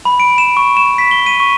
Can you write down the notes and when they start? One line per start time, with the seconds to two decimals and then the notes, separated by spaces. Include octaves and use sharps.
0.05 B5
0.20 D7
0.38 E7
0.57 C#6
0.77 E7
0.98 B6
1.11 G7
1.27 D#7
1.40 C#6